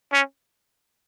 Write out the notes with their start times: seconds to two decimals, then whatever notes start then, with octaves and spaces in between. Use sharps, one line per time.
0.13 C#4